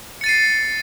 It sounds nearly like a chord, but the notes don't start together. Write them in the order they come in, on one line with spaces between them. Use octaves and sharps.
C#7 A6 D#7 C7